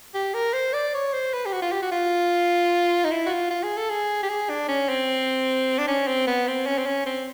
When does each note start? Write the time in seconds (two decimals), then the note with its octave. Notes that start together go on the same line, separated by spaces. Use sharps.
0.14 G4
0.34 A#4
0.53 C5
0.73 D5
0.93 C#5
1.13 C5
1.33 B4
1.45 G4
1.53 F#4
1.62 F4
1.72 G4
1.82 F#4
1.91 F4
3.04 D#4
3.11 E4
3.26 F#4
3.30 F4
3.50 F4
3.63 G#4
3.77 A4
3.89 G#4
4.23 G4
4.29 G#4
4.49 D4
4.68 C#4
4.89 C4
5.79 D4
5.87 C#4
6.08 C4
6.27 B3
6.47 C4
6.66 C#4
6.78 C4
6.86 C#4
7.06 C4